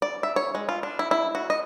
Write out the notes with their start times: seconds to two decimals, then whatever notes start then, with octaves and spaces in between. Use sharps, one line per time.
0.02 D5
0.23 E5
0.36 C#5
0.55 G#3
0.69 F4
0.83 D4
0.99 E4
1.11 E4
1.35 F#4
1.50 D#5